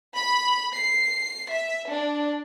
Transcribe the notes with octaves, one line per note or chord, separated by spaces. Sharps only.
B5
C7
E5
D4